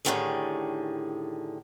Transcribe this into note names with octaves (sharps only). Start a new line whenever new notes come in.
A2 D3 D#3 A3 G4 G#4